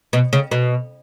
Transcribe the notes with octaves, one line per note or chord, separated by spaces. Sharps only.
B2
C#3
B2